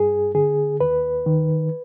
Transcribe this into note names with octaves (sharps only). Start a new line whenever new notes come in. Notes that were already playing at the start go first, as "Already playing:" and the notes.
Already playing: G2 G#4
D3 G#4
D#2 B4
D#3